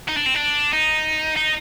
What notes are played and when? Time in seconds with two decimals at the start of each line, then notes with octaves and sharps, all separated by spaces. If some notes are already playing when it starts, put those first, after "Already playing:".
0.08 D#4
0.17 D4
0.26 C4
0.35 D4
0.73 D#4
1.37 D#4